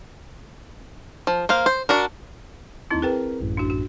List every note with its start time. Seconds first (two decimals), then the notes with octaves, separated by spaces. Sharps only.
1.27 F3
1.49 A#3 C5 F5
1.66 C5
1.89 D4 F#4 A#4
2.91 D#2 C4 D#4 E4 C6
3.02 C4 G#4 A#4 B4 G5
3.41 A1 F#2 A2
3.57 D4 F#4
3.70 F#4